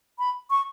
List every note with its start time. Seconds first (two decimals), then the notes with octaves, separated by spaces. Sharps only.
0.19 B5
0.50 C#6